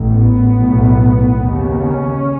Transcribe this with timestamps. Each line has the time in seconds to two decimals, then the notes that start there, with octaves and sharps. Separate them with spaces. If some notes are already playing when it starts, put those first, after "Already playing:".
Already playing: A1 A2
0.10 B3
0.52 B1 A2
1.37 D#2 C#3
1.80 C#4